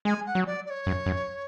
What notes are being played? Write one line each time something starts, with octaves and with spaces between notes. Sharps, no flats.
G#3 G#5
F#5
F#3
D5
D5
C#5
F#2
F#2